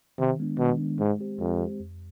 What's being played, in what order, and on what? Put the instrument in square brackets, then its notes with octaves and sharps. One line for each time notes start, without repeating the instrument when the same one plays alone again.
[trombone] C3 [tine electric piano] D#3
[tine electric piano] G#3 B3 D4
[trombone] B2 [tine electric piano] D#3
[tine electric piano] G#3 B3 D4
[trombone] G#2 [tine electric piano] G#3
[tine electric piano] C4 G4 C5
[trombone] F2 [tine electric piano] G#3
[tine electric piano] C4 G4 C5
F2